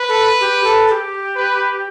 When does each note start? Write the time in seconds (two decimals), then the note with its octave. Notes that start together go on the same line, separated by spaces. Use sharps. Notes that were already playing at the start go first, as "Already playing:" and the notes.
Already playing: B4
0.09 A4
0.41 G4
0.64 A4
0.88 A4
0.91 G4
1.35 B4